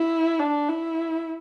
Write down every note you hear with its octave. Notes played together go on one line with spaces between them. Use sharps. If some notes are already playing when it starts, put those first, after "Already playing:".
Already playing: E4
D4
E4